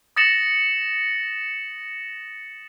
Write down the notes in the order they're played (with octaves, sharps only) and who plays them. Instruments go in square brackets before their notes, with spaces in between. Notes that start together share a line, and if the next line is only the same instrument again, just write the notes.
[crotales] D#6 A6 A#6 C#7 E7 F#7